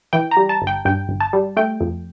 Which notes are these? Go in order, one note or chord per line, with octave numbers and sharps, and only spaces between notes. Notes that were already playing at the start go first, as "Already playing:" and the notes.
E3 G5
A#5
G3
A5
G1
G5
G2 G5
G1
A5
G3
A3 G5
F2